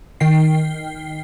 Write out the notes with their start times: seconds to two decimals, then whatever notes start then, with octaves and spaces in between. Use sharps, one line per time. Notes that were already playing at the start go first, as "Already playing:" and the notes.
0.20 D#3 G5 C7